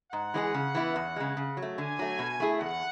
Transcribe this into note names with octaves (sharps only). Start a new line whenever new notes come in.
G#2 F#5
E3 G#3 D4 G#4
C#3
E3 B3 E4
E2
C#3 G#3
C#3
F#3
A3
D3 G#5
F#3 A3
B2
A3 E4 G#4
E2 F#5